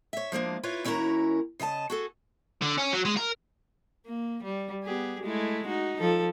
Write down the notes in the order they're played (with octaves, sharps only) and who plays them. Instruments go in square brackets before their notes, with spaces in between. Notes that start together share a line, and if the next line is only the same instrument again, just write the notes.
[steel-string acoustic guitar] C#5 E5
F3 G#3 A#3 D4
E4 F4 B4 C#5
D#2 C#4 E4 F#4 A#4 A#5
C#3 D#5 E5 A5
F#4 G#4 A4
[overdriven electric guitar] D3
C#4
F#3
G#3
A#4
[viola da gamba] A#3
G3
B3 G4 G#4
G#3 A3 E4
D#4 F#4
F3 A4